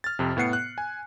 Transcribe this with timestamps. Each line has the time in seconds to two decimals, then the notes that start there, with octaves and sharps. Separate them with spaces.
0.04 F6 A6
0.19 F2 C3
0.37 A2 B3 F#5 C7 C#7
0.53 F#6
0.78 G#5